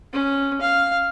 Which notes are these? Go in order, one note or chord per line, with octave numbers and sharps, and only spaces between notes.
C#4
F5